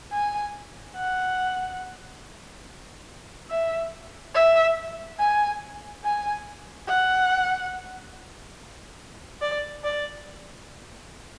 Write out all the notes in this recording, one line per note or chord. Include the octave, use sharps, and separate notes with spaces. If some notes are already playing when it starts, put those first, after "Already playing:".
G#5
F#5
E5
E5
G#5
G#5
F#5
D5
D5